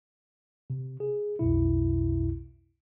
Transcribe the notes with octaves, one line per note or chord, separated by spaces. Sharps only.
C3
G#4
B1 F2 B2 E4